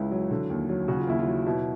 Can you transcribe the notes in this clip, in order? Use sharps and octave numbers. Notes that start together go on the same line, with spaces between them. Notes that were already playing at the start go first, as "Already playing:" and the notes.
Already playing: C#2 C#3 E4
F#3
D3
D#2
F#3
C#3 F#4
F4
D#2 E4
F4
F#3
B2 E4